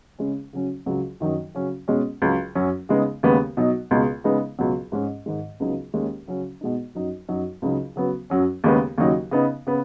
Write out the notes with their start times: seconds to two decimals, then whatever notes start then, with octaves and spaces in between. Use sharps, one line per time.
0.19 C#3 G#3 C#4
0.53 C#3 F#3 C#4
0.86 C#2 C#3 F#3
1.20 F#2 D#3 F#3 D#4
1.55 C#3 F#3 C#4
1.88 B2 G#3 C#4
2.22 C#2 C#3 F#3
2.55 F#2 F#3 C#4
2.89 C#3 G#3 B3 D#4
3.23 D#2 C#3 G#3 B3
3.57 B2 F#3 D#4
3.91 C#2 B2 G#3
4.24 C#3 G#3 B3 D#4
4.58 C#2 B2 F#3
4.92 G#2 G#3 C#4
5.26 G#2 D#3 G#3
5.60 C#2 C#3 F#3 B3 D#4
5.94 D#2 D#3 G#3 C#4
6.28 C#3 F#3 C#4
6.61 B2 G#3 D#4
6.95 F#2 F#3 D#4
7.29 F#2 F#3 D#4
7.62 C#2 C#3 F#3 D#4
7.96 C#3 F#3 B3
8.30 F#2 F#3 C#4
8.64 D#2 C#3 G#3 B3
8.98 D#2 C#3 F#3 D#4
9.31 C#3 B3 D#4
9.67 C#3 B3